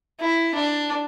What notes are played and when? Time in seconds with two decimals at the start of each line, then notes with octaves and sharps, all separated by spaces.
0.20 E4
0.54 D4